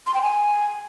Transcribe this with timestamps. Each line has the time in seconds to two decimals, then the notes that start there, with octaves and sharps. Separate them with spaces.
0.07 C6
0.14 G5
0.22 G#5